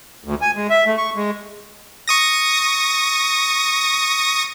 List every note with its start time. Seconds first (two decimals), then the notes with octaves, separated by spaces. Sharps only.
0.24 D2
0.42 G#5
0.55 G#3
0.70 E5
0.86 A3
0.98 C#6
1.16 G#3
2.08 C#6 D#6 A#6